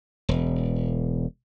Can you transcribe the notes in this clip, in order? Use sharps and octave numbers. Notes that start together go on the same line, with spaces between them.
E1